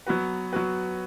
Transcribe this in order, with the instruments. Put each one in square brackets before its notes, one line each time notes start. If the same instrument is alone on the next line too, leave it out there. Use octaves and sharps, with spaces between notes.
[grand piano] F#3 B3 F#4 B4
F#3 B3 F#4 B4